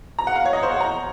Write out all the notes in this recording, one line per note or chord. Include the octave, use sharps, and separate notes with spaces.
A#5
F#5
F5
C#5
D#5
C5
F#5
A#5